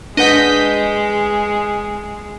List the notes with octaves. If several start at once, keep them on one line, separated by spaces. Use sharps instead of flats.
G#3 D4 B4 D#5 F#5 G6 B6